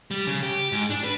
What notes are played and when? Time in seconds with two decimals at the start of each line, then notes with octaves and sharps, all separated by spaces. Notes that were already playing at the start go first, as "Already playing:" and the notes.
0.11 G3
0.27 C#3
0.43 G4
0.72 G#2
0.90 D4
1.04 B4